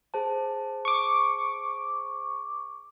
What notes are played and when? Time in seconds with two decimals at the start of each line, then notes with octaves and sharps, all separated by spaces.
0.14 G#4 C5 A5
0.85 C#6 D6